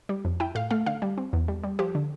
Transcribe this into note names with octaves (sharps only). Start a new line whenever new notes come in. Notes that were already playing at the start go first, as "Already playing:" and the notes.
G3
F2
E4 G5
A2 F5
A3 F5
D3 F5
G3
C4
E2
G3
G3
F3 G4
D3